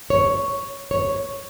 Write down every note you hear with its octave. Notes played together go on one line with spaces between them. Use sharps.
C#5
C#5